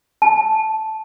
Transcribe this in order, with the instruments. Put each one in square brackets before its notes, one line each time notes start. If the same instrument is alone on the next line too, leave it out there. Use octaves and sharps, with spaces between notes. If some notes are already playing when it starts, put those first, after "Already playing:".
[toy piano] A5